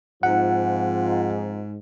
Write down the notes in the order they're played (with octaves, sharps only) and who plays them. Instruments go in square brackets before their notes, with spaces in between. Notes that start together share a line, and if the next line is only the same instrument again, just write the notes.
[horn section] G#2 [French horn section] F3 C4 F4 [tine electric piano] F#5